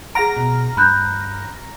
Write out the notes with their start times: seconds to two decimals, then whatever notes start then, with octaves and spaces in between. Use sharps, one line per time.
0.15 G#4 F#5 A#5 F6 A#6 D7
0.37 B2
0.77 G2 B5 F#6 G6